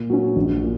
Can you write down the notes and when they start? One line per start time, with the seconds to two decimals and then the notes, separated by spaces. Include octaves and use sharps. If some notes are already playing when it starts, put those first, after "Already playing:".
Already playing: A#2
0.10 F#3 C#4
0.36 A#1
0.62 A#2